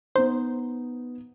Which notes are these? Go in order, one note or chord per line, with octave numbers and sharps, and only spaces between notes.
B3 D#4 C5